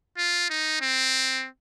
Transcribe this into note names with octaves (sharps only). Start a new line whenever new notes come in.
F4
D#4
C4